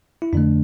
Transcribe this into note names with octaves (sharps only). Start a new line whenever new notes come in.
E4
F2 D3 A3 D4